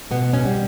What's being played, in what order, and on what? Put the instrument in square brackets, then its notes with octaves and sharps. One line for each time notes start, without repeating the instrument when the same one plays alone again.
[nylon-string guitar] B2 B3
C#4
G3